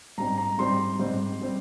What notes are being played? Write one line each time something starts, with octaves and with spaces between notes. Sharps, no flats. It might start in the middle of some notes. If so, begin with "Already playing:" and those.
G#2 G3 C4 A#5
A#5
G#2 G3 C4 C6
G#2 G3 C4
G3 C4